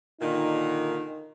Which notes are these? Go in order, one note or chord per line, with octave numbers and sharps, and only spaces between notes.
A#2 D3 D#3 D#4